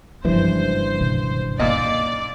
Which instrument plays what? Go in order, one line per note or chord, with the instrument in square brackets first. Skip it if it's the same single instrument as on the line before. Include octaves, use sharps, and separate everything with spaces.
[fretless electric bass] F#1 G2 E3 [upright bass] F3 G#3 [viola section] C5
[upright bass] B2 D#3
[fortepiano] A#2 D#5 [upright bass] C#4 D#4 [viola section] D5